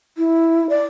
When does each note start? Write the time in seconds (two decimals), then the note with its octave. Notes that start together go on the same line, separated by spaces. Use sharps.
0.18 E4
0.70 D5